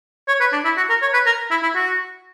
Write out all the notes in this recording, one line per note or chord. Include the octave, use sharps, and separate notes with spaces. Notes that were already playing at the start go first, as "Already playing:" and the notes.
C#5
B4
D4
E4
F#4
A#4
C#5
B4
A#4
E4
E4
F#4